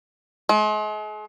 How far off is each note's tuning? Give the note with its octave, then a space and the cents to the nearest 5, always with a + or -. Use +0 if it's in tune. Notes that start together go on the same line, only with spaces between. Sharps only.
G#3 +40